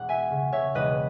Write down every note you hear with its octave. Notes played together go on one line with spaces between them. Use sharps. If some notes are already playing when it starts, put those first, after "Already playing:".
Already playing: E1 F#5
E5 G#5
C#3
C#5 E5
E1 B4 D#5